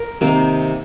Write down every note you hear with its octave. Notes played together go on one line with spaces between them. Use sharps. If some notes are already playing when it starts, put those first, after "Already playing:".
Already playing: A#4
C3 D#3 A#3